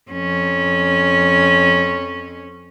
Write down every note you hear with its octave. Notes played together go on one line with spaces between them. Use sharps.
F2 C#4